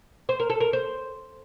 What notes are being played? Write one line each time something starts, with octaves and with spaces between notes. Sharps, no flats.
C5
A#4
A4
A#4
C5